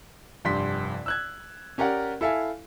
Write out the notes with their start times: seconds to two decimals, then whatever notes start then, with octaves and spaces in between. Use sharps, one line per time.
0.45 F1 G2 C6 B6
1.06 E6 F#6 G#6
1.78 C#4 G4 A#4 D5 F#5
2.21 E4 A4 E5 F5 G#5